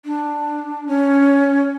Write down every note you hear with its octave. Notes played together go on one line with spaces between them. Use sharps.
D4
C#4